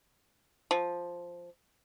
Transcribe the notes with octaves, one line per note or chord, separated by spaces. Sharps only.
F3